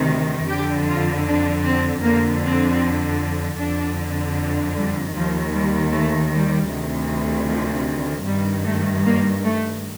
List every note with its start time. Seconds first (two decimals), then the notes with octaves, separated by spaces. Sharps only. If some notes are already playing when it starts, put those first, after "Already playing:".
Already playing: D2 C3 D#3
0.48 F2 D3 G4
0.87 F4
1.26 D4
1.65 C4
2.04 F2 D3 A#3
2.43 C4
3.60 F2 D3 D4
4.76 G3
5.15 D#2 D#3 F3
5.55 G3
5.93 A3
6.32 G3
6.71 D2 C3 D#3
7.49 F3
8.27 G2 D#3 G3
8.65 A3
9.05 A#3
9.44 A3